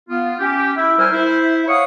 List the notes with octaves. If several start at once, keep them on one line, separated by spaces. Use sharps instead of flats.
B3 F4
C#4 G4
E4 E5
G3 A#4 C5 E5 G#5 F6
E4 C5 E5
C#5 F5 F#5 C#6 D#6